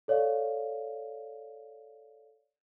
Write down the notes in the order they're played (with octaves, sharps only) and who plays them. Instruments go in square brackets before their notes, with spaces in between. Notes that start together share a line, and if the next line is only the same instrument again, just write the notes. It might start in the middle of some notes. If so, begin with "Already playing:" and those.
[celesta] A4 C#5 D5 F5